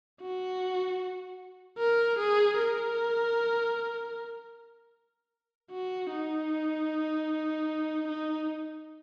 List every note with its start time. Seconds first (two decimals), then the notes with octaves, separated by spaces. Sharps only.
0.22 F#4
1.78 A#4
2.19 G#4
2.58 A#4
5.72 F#4
6.11 D#4
8.08 D#4